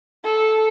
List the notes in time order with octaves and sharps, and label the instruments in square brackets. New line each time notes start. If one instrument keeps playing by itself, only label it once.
[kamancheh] A4